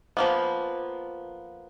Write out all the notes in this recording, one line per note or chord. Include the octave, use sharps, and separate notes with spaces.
F3 A#3 B3